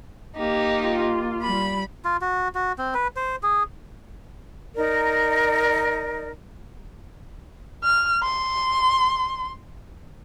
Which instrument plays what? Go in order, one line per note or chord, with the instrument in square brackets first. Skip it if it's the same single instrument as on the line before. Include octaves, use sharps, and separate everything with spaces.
[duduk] A#3 [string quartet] D#4 G4
[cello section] F4
[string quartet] G3 B5
[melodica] F4
F#4
F#4
C4
B4
C5
G#4
[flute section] D#4 A#4 D5
[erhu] F6
C6